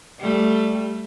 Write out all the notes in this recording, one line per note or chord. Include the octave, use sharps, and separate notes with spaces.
G3 A3